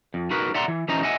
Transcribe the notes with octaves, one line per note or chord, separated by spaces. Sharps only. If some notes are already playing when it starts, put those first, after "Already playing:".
F2
D#4 F#4 A#4 B4
D5 E5 F#5 A#5 C6
E3
E3 C#4 D#4 C5 D#5 A#5
D#5 E5 F#5 G#5